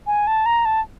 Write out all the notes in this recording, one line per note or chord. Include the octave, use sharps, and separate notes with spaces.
G#5
A5
A#5
A5